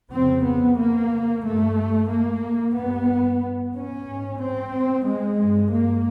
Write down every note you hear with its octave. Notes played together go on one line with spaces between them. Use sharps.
F2 C#3 C4
B3
A#3
G2 A3
A#3
G2 B3
C#4
G#2
C4
G#3
G2
A#3